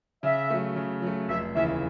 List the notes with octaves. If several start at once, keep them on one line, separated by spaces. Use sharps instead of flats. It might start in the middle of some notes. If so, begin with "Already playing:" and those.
C#3 E5
F#3 A3
C#3
F#3 A3
F1 E5
D#2 C#3 E3 E5